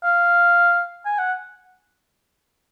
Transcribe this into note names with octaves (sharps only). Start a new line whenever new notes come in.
F5
G#5
F#5